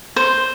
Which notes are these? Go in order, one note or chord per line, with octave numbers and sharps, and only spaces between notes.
C5